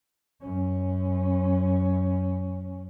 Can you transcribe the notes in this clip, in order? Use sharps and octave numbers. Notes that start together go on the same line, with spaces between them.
F#2 C#4